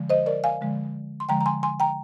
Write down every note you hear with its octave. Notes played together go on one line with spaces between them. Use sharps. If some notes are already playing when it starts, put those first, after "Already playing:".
Already playing: D3 F3 G#3
C5 D#5
A#4 D5
F5 G#5
D3 F3 G#3
C6
D3 F3 G#3 G5 A#5
A#5
G#5 C6
G#5 C6
G5 A#5